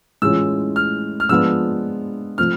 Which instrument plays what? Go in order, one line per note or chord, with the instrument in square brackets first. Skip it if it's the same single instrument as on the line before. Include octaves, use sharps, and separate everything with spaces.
[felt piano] A2 E3 G#3 C#4 F4 [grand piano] E6
[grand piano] F6
F6
[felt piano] F3 G#3 B3 D4 F4 [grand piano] E6
[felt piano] F3 A3 C4 F4 [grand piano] F6